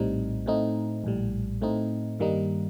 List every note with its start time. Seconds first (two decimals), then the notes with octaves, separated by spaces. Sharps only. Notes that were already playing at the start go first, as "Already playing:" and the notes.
Already playing: A#1 A2 G3 C4 D#4
0.46 A2 A3 C4 D#4
1.04 A#1 A2 G3
1.61 A2 A3 C4 D#4
2.19 G2 D#3 G3 A#3 D#4